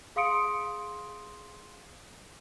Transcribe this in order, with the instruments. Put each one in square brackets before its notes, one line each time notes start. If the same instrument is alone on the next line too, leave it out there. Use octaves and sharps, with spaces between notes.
[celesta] G#4 F5 C6 D#6 C#7 D7